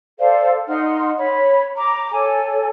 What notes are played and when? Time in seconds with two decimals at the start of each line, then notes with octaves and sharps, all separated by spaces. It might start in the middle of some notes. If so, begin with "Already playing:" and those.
0.19 A4 C5 D5 F5
0.68 D#4 F#5 C6 F6
1.18 C#5 B5
1.77 A#5 D6
2.12 A4 C#5 G#5